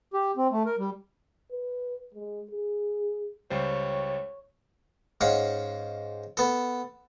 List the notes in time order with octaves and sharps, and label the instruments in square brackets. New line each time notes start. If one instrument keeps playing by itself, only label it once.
[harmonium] G4
C4
A3
A#4
G3
[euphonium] B4
G#3
G#4
[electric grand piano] C#2 G3 C5 [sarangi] C#5
[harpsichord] G#2 C#4 F5 F#5
B3 A4